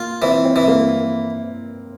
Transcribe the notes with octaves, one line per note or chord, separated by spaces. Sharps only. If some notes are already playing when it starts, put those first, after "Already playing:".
Already playing: A#3 F4
E3 C4
C4
E3
A#3